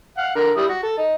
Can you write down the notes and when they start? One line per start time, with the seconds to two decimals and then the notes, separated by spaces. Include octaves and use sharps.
0.18 F5 F#5
0.35 D3 A#4
0.57 G3 E4 D#6
0.69 F#4
0.83 A4
0.98 D#4